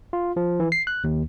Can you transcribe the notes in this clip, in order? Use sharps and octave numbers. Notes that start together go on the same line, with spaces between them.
F4
F3
E3
C7
F#6
D#2